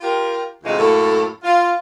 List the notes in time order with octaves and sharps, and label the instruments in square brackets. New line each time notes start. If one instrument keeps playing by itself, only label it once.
[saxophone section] F4 G4 A#4
D2 C3 E3 G#3 F4 F5
F#2 A2 A#3 A4
F4